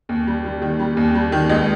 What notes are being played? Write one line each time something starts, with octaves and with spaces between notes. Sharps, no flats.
D#2
G3
G3
D#3
G3
D#2
G3
D#3
C#2 D#5